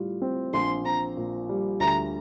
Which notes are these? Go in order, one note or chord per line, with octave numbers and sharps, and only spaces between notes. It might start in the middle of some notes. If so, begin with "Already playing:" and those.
Already playing: A2 G3 F4
C4
A#1 C6
C4 A#5
A#2
G3
D2 A#5